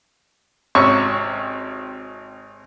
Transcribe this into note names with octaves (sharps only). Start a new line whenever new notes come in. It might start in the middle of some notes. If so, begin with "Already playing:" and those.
G#1 C3 C#4 C#6